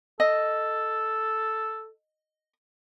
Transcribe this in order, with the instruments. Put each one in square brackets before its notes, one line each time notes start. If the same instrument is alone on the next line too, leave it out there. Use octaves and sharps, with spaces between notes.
[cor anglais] A4 [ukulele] D#5